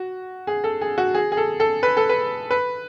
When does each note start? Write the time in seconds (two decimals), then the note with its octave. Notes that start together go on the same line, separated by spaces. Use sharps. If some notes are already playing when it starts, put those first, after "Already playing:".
Already playing: F#4
0.47 G#4
0.64 A4
0.81 G#4
0.98 F#4
1.14 G#4
1.32 G#4
1.37 A4
1.60 A4
1.83 B4
1.97 A4
2.09 B4
2.51 B4